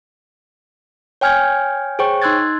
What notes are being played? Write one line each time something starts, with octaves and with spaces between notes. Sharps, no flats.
C#5 G5 G#5 F6 G6 G#6
G#4 C5 C#5 G5 C#6
D#4 C6 E6 F#6 G#6 A6